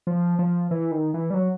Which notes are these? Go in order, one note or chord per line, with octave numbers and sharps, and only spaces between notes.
F3
F3
E3
D#3
E3
G3
F#3